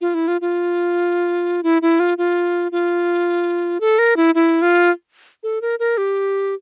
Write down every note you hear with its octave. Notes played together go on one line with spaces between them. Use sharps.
F4
E4
F4
F4
E4
E4
F4
F4
F4
A4
A#4
E4
E4
F4
A4
A#4
A#4
G4